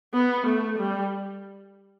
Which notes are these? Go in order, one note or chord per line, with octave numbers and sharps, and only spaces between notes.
B3
A3
G3